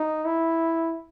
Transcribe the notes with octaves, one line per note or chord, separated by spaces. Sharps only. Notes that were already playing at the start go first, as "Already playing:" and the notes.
Already playing: D#4
E4